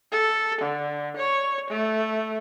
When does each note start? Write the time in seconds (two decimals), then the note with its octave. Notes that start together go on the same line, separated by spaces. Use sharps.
0.12 A4
0.62 D3
1.17 C#5
1.70 A3